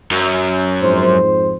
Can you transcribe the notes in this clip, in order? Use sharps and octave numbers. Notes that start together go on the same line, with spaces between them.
F#2
F2 G#2 C5